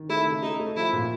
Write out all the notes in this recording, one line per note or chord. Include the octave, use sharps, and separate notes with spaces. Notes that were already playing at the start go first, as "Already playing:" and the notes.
Already playing: D#3
A3 E4
C#3
A3 D#4
A3
F3 E4
A#2